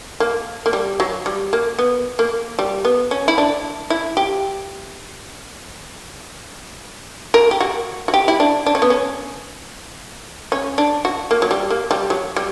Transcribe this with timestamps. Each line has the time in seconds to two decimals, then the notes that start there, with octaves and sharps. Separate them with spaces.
0.20 A#3
0.66 A#3
0.73 G3
1.00 F#3
1.26 G3
1.53 A#3
1.79 B3
2.19 A#3
2.59 G3
2.85 B3
3.11 C#4
3.28 E4
3.38 D4
3.90 E4
4.17 G4
7.34 A#4
7.51 G4
7.60 F#4
8.08 F#4
8.14 G4
8.28 E4
8.40 D4
8.66 D4
8.75 C#4
8.82 B3
8.90 C#4
10.52 C#4
10.78 D4
11.05 F#4
11.31 A#3
11.42 F#3
11.51 G3
11.70 A#3
11.91 G3
12.10 F#3
12.36 G3